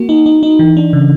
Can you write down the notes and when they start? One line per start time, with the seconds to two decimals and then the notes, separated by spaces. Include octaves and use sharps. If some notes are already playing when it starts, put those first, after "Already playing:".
Already playing: A#3 F#4
0.09 D#4
0.26 D#4
0.43 D#4
0.59 E3
0.77 D4
0.93 C#3